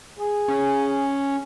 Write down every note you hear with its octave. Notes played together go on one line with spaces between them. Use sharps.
G#4
C#4